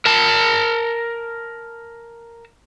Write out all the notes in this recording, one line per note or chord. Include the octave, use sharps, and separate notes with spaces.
A#4 A5